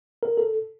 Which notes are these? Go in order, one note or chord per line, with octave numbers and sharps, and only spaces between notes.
A#4
A4